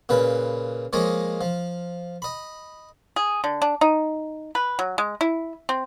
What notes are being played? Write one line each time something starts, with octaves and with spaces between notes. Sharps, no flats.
A#2 C#3 B4
F3 G#3 A#3 C#5 D#5
F3
D#5 B5
G#4
D3
D4
D#4
B4
F#3
G#3
E4
C4